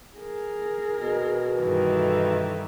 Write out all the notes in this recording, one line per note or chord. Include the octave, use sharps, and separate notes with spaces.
G#4 A#4
B2
G2 D#3 E3
A4 E5